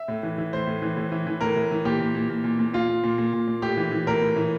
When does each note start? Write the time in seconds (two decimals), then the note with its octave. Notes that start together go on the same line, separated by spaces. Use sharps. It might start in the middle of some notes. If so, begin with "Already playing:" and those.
Already playing: E5
0.08 A2
0.23 E3
0.38 E3
0.53 A2 C5
0.67 A2
0.82 E3
0.97 A2
1.12 E3
1.27 E3
1.41 A2 A#4
1.56 A2
1.71 E3
1.85 A#2 G4
2.00 A#2
2.15 A#2
2.30 A#2
2.44 A#2
2.59 A#2
2.73 A#2 F4
2.89 A#2
3.04 A#2
3.18 A#2
3.33 A#2
3.48 A#2
3.62 A2 G4
3.77 E3
3.92 E3
4.07 A2 A#4
4.21 A2
4.36 E3